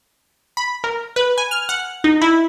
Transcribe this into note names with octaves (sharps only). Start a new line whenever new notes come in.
B5
A#4
B4
G#5
F6
F#5
D#4
E4